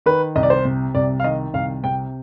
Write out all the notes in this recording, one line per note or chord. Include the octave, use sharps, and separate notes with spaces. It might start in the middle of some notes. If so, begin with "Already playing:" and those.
D#3 B4
C2 D#5
D5
C5
C3
C2 D5
F5
D#3 D#5
C2 F5
C3 G5